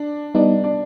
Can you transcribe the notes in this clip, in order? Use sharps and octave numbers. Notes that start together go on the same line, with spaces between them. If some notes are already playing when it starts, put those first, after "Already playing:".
Already playing: D4 D5
G3 B3 D4 D#4 D5
D4 D5